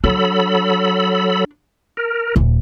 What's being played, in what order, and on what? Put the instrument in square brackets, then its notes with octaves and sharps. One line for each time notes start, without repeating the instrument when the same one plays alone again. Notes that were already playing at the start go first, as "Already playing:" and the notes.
[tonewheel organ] F#3 A4 B5 [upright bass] D4
[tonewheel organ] A#4
[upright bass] D#1